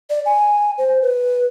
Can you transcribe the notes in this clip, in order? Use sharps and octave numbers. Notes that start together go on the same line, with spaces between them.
D5
G#5
C5
B4